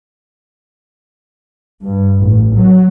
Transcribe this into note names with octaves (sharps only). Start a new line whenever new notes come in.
G2
A1
F#3